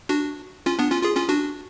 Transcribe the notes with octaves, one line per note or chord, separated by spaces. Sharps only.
D4 F#4
C#4 F4
B3 D4
C#4 F4
F4 G#4
C#4 F4
D4 F#4